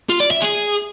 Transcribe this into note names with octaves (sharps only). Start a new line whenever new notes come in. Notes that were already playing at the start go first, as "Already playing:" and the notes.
F4
D5
E5
G#4